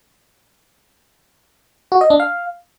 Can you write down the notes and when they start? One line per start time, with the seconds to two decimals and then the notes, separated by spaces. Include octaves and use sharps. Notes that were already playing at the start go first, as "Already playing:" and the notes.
1.92 F#4
2.01 D#5
2.10 D4
2.20 F5